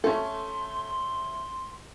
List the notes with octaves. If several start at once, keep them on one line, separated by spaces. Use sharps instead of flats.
A3 C#4 A4 C6